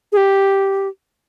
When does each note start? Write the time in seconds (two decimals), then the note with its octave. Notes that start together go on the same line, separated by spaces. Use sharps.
0.12 G#4
0.17 G4